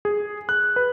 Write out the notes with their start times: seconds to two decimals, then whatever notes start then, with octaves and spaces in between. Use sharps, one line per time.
0.05 G#4
0.49 F#6
0.76 B4